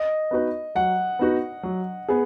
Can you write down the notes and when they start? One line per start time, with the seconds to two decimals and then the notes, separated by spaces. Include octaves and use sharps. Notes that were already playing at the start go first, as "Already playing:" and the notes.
Already playing: D#5
0.31 B3 D#4 F#4 B4
0.75 F#3 F#5
1.19 B3 D#4 F#4 B4
1.63 F#3
2.09 B3 G#4